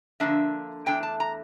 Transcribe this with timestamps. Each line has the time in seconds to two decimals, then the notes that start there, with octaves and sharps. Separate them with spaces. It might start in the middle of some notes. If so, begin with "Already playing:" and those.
0.20 D3 F3 A#3 D4 E5
0.86 E2 E3 A3 D4 G5
1.03 A5
1.20 A#5